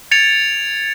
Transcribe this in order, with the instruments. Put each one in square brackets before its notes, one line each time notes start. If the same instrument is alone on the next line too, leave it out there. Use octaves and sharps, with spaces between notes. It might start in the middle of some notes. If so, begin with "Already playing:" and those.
[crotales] G#6 A6 C#7 D7 F7